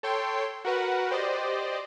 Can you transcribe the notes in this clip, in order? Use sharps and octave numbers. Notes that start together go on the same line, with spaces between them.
A4 C#5 G5 C6
F#4 A#4 B4 F#5
G4 C5 D5 D#5